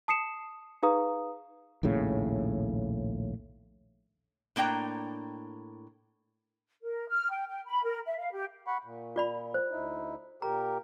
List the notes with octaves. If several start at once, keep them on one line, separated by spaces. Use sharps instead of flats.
A5 D#6 C7 C#7 E7
D#4 G#4 B4 F5 A#5 D#6
A#1 D#2 A2 C#3
A2 A#3 D4 G5 A#5
A#4
F6
G5
G5
B5
A#4
E5
F5
G4
F#5 B5 C#6
A#2
F4 D5 B5
C5
D2 D#4 E4
A#2 G4 A#4 A#5